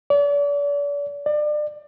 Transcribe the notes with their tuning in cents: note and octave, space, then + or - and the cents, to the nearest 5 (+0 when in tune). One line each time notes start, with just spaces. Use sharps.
D5 -40
D5 +30